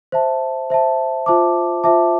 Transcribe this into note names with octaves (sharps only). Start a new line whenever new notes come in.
C5 E5 A5
C5 E5 A5
F4 C5 E5 A5 D6
F4 C5 E5 A5 D6